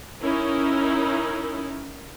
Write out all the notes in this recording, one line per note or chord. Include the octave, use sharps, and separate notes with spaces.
C#4 D#4 E4 A#4